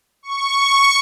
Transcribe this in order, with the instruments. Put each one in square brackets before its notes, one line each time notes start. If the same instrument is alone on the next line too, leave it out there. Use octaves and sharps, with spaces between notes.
[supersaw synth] C#6